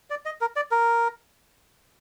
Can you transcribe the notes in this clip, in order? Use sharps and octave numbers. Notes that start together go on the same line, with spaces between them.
D5
D#5
A#4
D5
A#4